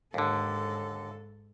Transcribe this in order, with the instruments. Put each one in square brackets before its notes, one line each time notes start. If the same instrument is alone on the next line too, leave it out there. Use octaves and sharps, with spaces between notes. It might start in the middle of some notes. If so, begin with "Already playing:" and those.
[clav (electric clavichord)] D#2 D3 [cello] G#2 A4